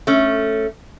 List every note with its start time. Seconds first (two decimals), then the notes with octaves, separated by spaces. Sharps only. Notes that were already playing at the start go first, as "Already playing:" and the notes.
0.07 A3 C#4